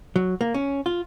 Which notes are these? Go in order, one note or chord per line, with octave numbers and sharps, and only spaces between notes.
F#3
A#3
C#4
F4